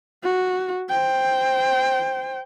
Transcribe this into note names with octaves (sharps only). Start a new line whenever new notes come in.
F#4
C5 G5